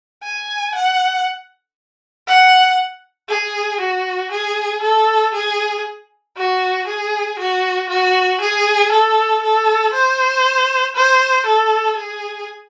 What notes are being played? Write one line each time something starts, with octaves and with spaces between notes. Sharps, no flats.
G#5
F#5
F#5
G#4
F#4
G#4
A4
G#4
F#4
G#4
F#4
F#4
G#4
A4
A4
C5
C5
A4
G#4